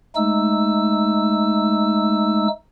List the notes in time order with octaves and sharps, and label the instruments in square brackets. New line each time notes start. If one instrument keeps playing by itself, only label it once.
[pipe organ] G#3 A3 D#4 E6